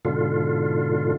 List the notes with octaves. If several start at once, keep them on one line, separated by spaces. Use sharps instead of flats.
G#2 B2 D3 F4